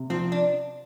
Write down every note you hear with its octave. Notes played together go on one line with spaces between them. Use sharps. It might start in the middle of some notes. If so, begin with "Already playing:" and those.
Already playing: C3
F3 C4
D4